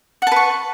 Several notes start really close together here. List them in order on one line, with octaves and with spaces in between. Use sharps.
F#5 A5 B4 C#6